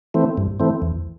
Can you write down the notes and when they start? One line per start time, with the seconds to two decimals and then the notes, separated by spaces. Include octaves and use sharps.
0.14 E3 A3 C4
0.37 G2
0.60 E3 A3 C4
0.82 E2